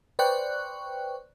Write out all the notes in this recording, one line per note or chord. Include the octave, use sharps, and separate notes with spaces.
B4 C5 D5 G5 C#6 F#6